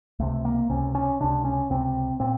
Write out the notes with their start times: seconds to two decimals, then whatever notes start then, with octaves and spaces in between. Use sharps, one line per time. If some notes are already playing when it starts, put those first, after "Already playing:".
0.19 C#2 C3 A3
0.45 A#3
0.70 C#2 C3 C#4
0.95 C#4
1.20 C#2 C3 D4
1.44 C#4
1.70 C#2 C3 C4
2.20 A#2 C4